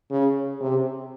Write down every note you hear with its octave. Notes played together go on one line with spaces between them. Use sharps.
C#3
C3